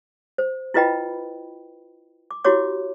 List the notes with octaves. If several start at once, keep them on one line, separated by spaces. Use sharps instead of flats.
C5
E4 F4 B4 D#5 G5 B5
D6
E4 F#4 G4 C#5 D6